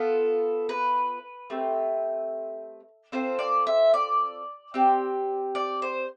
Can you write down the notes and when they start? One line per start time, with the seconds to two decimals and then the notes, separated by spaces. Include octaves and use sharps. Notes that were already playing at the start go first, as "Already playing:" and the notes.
Already playing: B3 F4 A4
0.69 B4
1.50 A3 C4 G4
3.12 C4 F4 A4 C5
3.39 D5
3.67 E5
3.94 D5
4.74 C4 G4
5.55 D5
5.82 C5